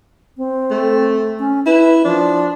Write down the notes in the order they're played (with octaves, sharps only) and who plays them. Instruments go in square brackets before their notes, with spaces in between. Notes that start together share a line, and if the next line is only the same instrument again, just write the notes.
[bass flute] C4
[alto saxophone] A3
[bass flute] C#4
[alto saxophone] E4 [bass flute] B4
[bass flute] F3 [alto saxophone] D4